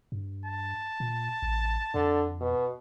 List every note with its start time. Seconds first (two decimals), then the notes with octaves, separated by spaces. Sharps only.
0.12 G2
0.46 A5
1.00 A#2
1.42 A1
1.94 F2 D3
2.40 B2